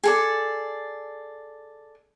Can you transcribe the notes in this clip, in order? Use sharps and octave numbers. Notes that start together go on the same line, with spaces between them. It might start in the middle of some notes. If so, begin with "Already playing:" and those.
G#4 A4 D5